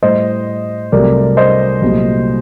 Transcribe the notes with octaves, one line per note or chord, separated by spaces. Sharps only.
A2 G3 C5 D#5
C2 C3 F#3 A3 A#4 D5
C5 D#5
C2 A#2 F#3 A3